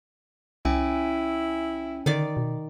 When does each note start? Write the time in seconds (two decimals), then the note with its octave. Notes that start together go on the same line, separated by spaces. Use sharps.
0.65 C2 C#4 E4 G5 G#5
2.06 D3 D#3 D5
2.37 B2